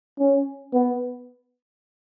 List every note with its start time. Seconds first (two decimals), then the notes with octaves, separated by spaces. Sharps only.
0.20 C#4
0.74 B3